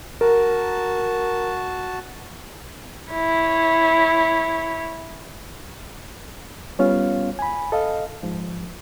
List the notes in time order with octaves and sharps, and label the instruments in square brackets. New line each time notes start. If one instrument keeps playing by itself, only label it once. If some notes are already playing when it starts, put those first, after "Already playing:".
[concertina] F#4 A5 [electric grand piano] A#4
[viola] E4 C#5
[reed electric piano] G3 B3 C#4 F4 C#5 F5
G#5 B5
A4 D#5 F5
G#2 F3